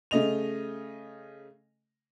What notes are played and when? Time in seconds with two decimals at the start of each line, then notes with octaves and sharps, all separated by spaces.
0.11 C#3 A3 D#5 F7